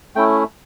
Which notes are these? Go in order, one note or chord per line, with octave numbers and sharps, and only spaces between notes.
A3 C#4 E4 G5